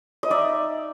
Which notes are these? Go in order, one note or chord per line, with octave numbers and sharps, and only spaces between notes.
D#5
D#4 D5 E5